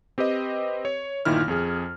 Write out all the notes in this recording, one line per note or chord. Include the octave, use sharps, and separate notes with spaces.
C4 G4 B4 D#5
C#5
G1 A#2 D#3 E4 F6
F2 G#4